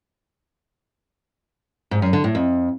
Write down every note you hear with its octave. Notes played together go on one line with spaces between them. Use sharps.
G#2
F#2
D3
A2
F2